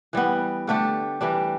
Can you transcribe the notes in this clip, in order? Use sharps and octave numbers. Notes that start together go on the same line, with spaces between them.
E3 G3 B3
D3 A3 D4 G4
E3 G3 D4